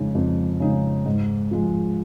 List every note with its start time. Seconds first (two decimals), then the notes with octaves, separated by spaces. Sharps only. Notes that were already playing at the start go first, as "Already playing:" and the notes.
Already playing: F2 C#3 G#3 D#4
0.15 F2
0.60 C#3 G#3 D#4
1.05 G#2
1.51 F3 G#3